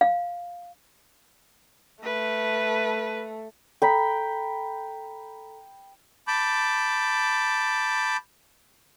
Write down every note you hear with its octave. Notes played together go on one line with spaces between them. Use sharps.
F5
A3 B4
A4 G5 A#5 B5 B6
A5 B5 D6 G6